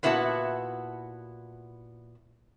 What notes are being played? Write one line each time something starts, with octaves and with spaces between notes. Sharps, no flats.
A#2 B3 E4 F#4 C5 A5